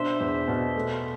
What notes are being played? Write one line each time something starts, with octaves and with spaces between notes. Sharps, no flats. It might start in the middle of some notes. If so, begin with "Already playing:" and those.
Already playing: B2 D4 C5 E5
E2
B2
A3